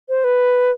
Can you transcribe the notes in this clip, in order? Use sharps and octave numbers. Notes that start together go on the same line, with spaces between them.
C5
B4